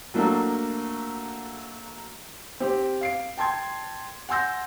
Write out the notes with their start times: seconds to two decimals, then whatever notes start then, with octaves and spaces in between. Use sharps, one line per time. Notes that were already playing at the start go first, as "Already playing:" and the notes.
0.14 F#3 A3 A#3 D4 F#4
2.60 C4 G4
3.01 F5 C7 D7
3.37 G5 A5 C6 G#6
4.29 F#5 G#5 C6 E6 G6 A#6